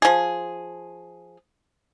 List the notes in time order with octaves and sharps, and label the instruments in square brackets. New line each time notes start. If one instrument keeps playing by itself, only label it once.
[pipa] F3 G#4